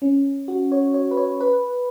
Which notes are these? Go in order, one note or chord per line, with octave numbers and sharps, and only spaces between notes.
C#4
F#4
C#5
C#5
B4
C#5
B4